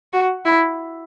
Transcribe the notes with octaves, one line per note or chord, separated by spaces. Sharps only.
F#4
E4